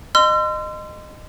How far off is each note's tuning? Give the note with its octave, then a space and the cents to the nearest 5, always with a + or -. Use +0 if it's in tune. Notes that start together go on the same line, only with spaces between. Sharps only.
D#5 -20 C6 -25 E6 +45